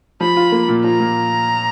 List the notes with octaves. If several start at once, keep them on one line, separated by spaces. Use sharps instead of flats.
F3 B5
F4
A#3
A#2
F3 A#5
A#2